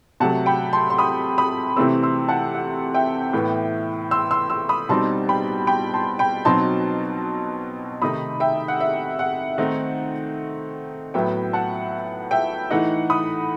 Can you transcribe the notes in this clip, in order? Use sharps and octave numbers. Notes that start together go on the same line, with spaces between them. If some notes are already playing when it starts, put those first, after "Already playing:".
C3 F#3 A3 F#5 A5
G5 B5
A5 C6
C6
B5 D#6
B5 D#6
C3 E3 A3 C4 C6 E6
C6 E6
F#5 A5
F#5
E5 G5
A2 E3 B3
C6 E6
C6 E6
C6 E6
B5 D#6
B2 G3 C4 D#4 A5 C6
G5 B5
G5 B5
A5 C6
G5 B5
B2 F#3 C4 D#4 A5 C6
C3 D#3 A3 D#4 B5 D#6
E5 G5
F#5
E5
F#5
D#3 A3 C4 D#4
A2 F#3 B3 E5 G5
F#5 A5
E5 G5
E3 A3 D#4 F#5
B5 D#6